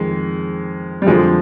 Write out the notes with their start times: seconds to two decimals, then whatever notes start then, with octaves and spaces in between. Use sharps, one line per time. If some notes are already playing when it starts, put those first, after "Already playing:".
Already playing: F2 D#3 G#3
1.02 G3
1.07 F2 D3 F3 G#3